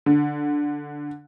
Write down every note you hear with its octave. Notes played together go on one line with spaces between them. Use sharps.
D3